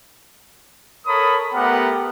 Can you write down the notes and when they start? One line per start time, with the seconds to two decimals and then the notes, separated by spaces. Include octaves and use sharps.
1.06 A4 A#4 C#5 B5 D#6
1.55 A3 B3 G4 A#4 F#5